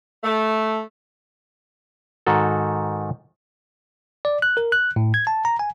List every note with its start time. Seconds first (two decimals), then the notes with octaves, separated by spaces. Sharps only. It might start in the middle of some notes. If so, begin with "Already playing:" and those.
0.23 A3
2.27 G#2 D#3 F#4 A4
4.25 D5
4.42 F#6
4.57 A#4
4.72 F#6
4.96 A2
5.14 G#6
5.27 A5
5.45 A#5
5.59 G#5